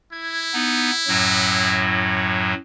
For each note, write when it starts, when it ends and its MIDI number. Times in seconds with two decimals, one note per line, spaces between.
0.12 2.02 64
0.12 0.43 92
0.54 0.91 59
0.54 0.91 63
1.07 2.54 42
1.07 2.54 45
1.07 2.54 54